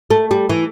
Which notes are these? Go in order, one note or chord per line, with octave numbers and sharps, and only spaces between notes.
A3
G3
E3